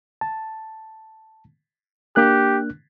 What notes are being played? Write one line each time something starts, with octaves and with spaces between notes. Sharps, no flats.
A5
A#3 D4 G4 F#6